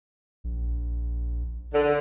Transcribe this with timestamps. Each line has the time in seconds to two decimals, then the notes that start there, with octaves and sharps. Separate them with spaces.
0.44 A#1
1.73 D3